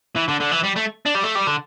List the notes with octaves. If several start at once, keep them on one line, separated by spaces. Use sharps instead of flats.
E3
D3
D3
E3
G3
A3
D4
G3
A3
G3
D3